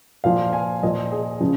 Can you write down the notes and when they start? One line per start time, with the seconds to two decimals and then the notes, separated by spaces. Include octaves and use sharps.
0.24 A#2 F3 F5
0.53 G#5
0.83 A#2 F3 D#5
1.12 G#4
1.41 C#3 F3